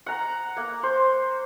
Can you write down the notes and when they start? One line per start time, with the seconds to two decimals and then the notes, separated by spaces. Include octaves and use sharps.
0.06 F#5 A#5
0.57 A#3
0.83 C5